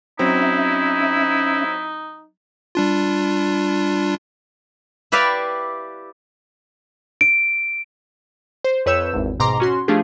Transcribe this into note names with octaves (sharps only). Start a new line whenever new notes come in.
F#3 C4 C#4 D#4 E4 E5
G3 D4 F4
E4 G4 B4 D5 E5 F5
D7
C5
F2 B4 C#5 E6 G6 E7
G#1 E2
G#2 B2 A#5 C6 D6
C#4 F#4 C6
F3 A3 D4 F4 G4 G#4